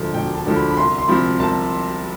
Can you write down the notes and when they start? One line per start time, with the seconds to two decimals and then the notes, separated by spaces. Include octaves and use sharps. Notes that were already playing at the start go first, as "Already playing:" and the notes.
Already playing: E1 D2 D3 F3
0.14 E1 G5
0.35 A5
0.45 D2 D3 F3
0.56 B5
0.71 B5
0.77 C2 C6
0.98 C6
1.08 C3 F3 B5
1.39 C2 A5